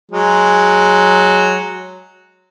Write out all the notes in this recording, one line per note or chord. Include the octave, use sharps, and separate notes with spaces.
F#3 G#3